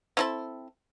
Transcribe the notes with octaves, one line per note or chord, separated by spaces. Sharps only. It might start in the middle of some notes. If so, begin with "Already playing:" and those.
C4 E4 A4